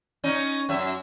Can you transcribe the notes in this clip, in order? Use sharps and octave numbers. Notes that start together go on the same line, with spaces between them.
C#4 D#4
F#2 E5